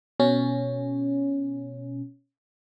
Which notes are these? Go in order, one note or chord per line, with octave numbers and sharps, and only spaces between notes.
B2 C#4